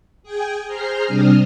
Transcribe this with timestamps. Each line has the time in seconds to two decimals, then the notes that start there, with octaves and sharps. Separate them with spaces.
0.23 G#4 G5 G#5
0.67 G#4 C5 A#5 C6 F6
1.06 C3 G3 C4 D4 D#6 F6